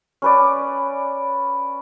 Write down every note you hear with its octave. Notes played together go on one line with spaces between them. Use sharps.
C#4 B4 D5